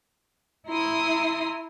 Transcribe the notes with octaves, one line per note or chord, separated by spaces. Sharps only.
E4 A#5 C6 D#6